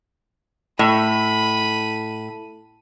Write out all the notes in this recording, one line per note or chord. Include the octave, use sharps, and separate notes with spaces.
A2 B5 D#7